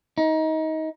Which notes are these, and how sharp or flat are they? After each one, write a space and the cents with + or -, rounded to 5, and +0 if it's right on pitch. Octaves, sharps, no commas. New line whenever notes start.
D#4 +25